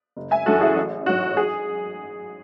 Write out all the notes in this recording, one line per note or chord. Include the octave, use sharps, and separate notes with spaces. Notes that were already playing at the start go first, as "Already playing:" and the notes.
F#1
E5 G#5
F#2 E3 F#4 A4
E4 G#4
A1
G#2 F#3 F#4
G#4